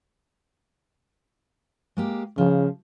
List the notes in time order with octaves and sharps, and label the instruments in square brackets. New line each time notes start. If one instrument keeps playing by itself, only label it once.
[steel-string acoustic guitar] G#3 A#3 G4
[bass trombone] C#3 [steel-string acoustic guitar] F3